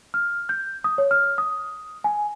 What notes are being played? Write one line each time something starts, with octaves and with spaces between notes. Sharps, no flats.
F6
G6
D#6
C#5
F6
D#6
G#5